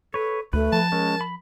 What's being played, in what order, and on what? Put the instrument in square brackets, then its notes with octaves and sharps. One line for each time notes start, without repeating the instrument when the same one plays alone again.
[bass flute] A4 [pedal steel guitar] B4 C#5
[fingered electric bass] D2 [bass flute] A3 [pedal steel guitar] B4
[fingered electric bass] F3 [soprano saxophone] A5
[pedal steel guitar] G#3 C#4 [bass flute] A#4
[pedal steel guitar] B5